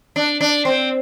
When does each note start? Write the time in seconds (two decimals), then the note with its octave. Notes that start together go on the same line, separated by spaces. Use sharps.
0.16 D4
0.41 D4
0.65 C4